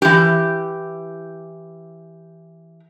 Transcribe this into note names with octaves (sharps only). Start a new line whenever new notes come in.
E3 G4